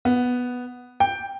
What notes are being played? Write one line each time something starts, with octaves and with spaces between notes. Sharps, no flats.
B3
G5